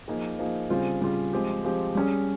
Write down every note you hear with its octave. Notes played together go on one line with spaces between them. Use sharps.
F3 A#3 D#4 G#4
F3 A#3 D#4 G#4
C#3 G3 C4 F4 G#4
C#3 G3 C4 F4 G#4
F3 G#3 C4 G4
F3 G#3 C4 G4
G3 C#4 G#4